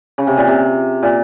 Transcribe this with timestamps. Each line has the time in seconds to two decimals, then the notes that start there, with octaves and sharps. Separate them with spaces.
0.18 C#3
0.27 C3
0.37 A#2
0.48 C3
1.03 A#2